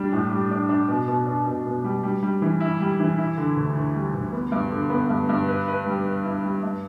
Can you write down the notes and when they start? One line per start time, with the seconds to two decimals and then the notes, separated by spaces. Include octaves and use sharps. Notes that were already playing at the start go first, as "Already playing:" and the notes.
Already playing: G3 D4
0.12 A2
0.31 G3
0.51 D4
0.69 D4
0.88 B2
1.08 B2
1.26 D4
1.46 B2
1.66 B2
1.84 G3
2.03 G3
2.23 G3
2.42 E3
2.60 E4
2.80 G3
3.00 E3
3.18 E4
3.38 D3
3.56 D2
3.75 D2
3.95 G3
4.14 D2
4.33 B3
4.52 G2
4.72 D3
4.90 B3
5.10 G2
5.29 G2
5.48 B4
5.68 B4
5.86 G3
6.06 B4
6.25 E4
6.44 G3
6.63 G2